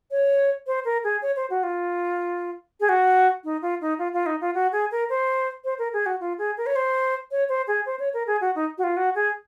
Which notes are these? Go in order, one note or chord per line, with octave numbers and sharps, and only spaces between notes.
C#5
C5
A#4
G#4
C#5
C5
F#4
F4
G#4
F#4
D#4
F4
D#4
F4
F4
D#4
F4
F#4
G#4
A#4
C5
C5
A#4
G#4
F#4
F4
G#4
A#4
C#5
C5
C#5
C5
G#4
C5
C#5
A#4
G#4
F#4
D#4
F#4
F4
F#4
G#4